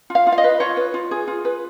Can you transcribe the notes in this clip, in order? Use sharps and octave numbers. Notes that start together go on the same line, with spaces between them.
F4
F5
F4
F5
D#5
B4
F4 C#5
B4
F4
G#4
F4
B4